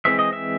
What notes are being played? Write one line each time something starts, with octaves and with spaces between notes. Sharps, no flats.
E3 G#3 C4 E5
D#5
E5